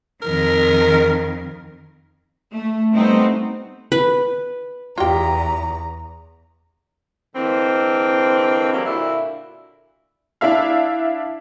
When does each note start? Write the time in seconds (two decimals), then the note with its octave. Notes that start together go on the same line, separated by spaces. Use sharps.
0.22 F2 D#3 A#4
2.52 A3
2.94 G3 A3 B3 C4 D#4
3.92 B4
4.98 E2 F4 G4 A#5
7.36 D3 E3 G#3 A#3 C4
8.73 F#3 G3 A#3
8.86 A#2 D3 D4 E4 F#4 E5
10.41 D4 E4 E5 F5